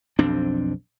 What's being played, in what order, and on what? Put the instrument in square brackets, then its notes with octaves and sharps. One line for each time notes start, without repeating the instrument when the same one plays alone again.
[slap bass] B1 F2 C4 D4